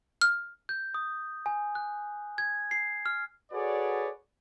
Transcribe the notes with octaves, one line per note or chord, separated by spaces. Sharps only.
F6
G6
D#6
G#5
F#6
G#6
C7
F6
F#4 G#4 A4 B4 C#5 D5